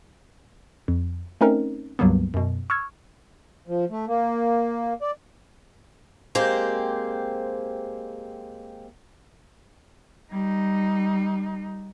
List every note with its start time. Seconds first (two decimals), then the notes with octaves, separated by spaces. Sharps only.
0.88 F2
1.41 A3 C4 C#4 D#4 A#4
1.99 C#2 G2 F#3 G3 A#3 B3
2.34 F#2 B2
2.70 C#6 E6 F6 G#6
3.68 F3
3.90 A3
4.07 A#3
5.01 D5
6.35 G#3 A#3 C4 G4 C5
10.32 G3 D#4